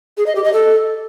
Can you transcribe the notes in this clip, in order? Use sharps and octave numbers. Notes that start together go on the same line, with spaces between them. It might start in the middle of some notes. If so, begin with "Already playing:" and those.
G#4
D#5
G4
D#5
A4